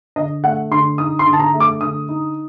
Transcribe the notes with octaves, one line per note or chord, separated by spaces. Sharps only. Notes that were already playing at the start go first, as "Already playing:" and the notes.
D3 D#5
A3 F#5
D3 C6
D#4 D#6
C6
D3
A5
A#5
A3
D6
D3 D#6
D#4